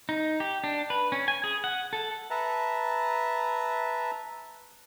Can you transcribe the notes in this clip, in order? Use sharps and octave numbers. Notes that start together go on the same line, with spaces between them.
D#4
G4
D4
B4
C#4
G#5
G#4
F#5
A4
B4 E5 A5 A#5